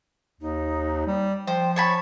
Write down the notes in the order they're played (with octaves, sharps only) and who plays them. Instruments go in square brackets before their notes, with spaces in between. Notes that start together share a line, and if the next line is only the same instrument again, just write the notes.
[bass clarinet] D#2 [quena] D#4
[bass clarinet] G3
[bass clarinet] F3 [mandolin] C5 [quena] G5
[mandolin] C#5 A5 B5 [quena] C#6